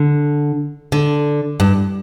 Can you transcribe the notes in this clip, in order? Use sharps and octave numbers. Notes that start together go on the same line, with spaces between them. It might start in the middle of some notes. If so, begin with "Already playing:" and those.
Already playing: D3
D3
G2